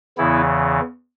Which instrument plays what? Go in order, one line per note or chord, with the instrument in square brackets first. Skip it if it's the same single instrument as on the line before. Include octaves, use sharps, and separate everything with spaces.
[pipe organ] E2 C#3 E3 B3 E4